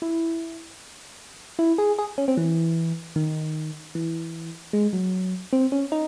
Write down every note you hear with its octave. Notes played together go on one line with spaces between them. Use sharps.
E4
E4
G#4
G#4
C#4
C4
E3
D#3
E3
G#3
F#3
C4
C#4
D#4